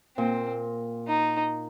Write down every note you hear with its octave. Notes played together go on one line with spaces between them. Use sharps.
A#2 C4
D#4